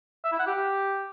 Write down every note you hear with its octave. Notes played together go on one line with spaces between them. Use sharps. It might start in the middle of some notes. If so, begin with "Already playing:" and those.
E5
E4
F#5
G4